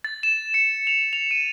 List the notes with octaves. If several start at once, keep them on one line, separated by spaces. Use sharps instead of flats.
A6
E7
C#7
F7
F7
D#7